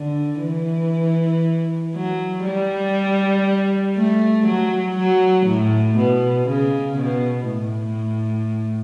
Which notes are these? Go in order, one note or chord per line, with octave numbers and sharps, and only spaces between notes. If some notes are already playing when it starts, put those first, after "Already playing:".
Already playing: D3
E3
F#3
G3
A3
F#3
F#3
A2
B2
C#3
B2
A2